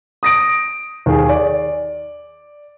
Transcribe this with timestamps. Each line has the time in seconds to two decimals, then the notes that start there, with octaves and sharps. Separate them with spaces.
0.23 D#6 A#6 D7
1.06 D#2 G#4
1.29 D5